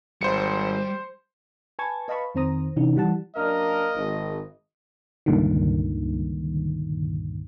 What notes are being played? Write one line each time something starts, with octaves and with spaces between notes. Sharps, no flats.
G#1 G3 C5 C#7
B4 G#5 A5 C#6 G#6 A6
B4 D#5 F5 A5 B5 C#6
F2 D#3 C4 C5 A#5 D#6
C3 E3 C#4 D#4
E3 G3 F#5 A5
F#2 A#3 D4 A#4 D#5 F6
G#1
C#2 G2 A#2 D3 D#3